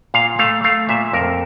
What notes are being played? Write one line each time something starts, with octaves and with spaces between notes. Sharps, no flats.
A#2 F5
A3 F5
A3 F5
A#2 E5
F2 A#4